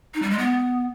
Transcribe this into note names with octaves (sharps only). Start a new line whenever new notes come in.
D#4
G3
G#3
B3